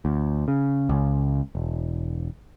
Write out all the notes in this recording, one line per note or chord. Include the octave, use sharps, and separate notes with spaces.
D2
C#3
C#2
E1